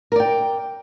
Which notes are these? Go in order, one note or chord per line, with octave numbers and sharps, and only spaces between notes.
A#4 D5 G5